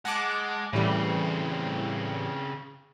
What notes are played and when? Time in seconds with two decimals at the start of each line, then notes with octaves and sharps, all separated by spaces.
0.05 G#3 F#5 A5 D6
0.73 A2 C#3 E3 G3 C4